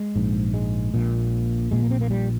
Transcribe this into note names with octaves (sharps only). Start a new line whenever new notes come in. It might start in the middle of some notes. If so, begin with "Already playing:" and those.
Already playing: G#3
A#1 G#2
G#3
A#1 A#2
A#1 A#2 G#3
A#3
C4
A#3
G3